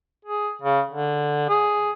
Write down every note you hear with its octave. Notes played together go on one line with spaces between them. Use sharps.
G#4
C#3
D3
G#4